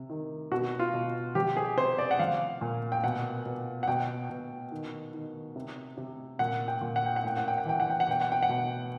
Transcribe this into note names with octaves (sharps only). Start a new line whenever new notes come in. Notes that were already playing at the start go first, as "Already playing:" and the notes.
Already playing: C3
D#3
B2 F#4
F4
B2
F3 G4
G#4
C3 C5
D5
F#5
F3 F5
A#2
G5
B2 F#5
B2
F#5
B2 G5
B2
D#3
D#3
C3
C3
A#2 F#5
G5
A#2
F#5
G5
F#5
A2 G5
F#5
G5
F#5
E3 G5
F#5
G5
F#5
B2 G5
F#5
G5
F#5
B2